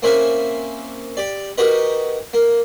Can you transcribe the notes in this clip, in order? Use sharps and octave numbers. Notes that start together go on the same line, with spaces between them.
A#3 C4 C#4 E4 E5 G#5
G4 D5
D#4 F#4 G4 A#4 B4 D#5
A#3